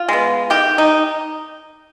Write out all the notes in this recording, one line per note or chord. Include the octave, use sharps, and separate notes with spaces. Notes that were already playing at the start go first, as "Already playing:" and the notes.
Already playing: F4
G#3 B3
D#3 G4
D#4